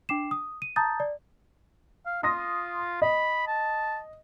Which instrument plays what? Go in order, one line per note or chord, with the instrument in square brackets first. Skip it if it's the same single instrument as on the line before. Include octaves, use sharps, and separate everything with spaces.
[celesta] D4 G5 D6 C7 E7
D#6
D#7
A5 A#5 D#6 G6 A6
D5
[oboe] F5
[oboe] F4 [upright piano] C6 D#6 A#6
[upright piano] D#5 [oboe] B5
[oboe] A5